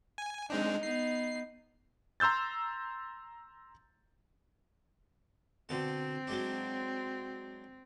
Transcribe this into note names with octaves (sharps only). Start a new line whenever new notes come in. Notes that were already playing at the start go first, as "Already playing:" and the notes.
G#5
G#3 C4 D4 D#4
B3 D#4 C7
A#5 C6 E6 G6 A6
B2 D3 C4 A5
F#3 G#3 D4